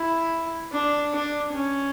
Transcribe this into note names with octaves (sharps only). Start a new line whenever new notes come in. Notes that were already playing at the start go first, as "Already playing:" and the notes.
Already playing: E4
D4
D4
C#4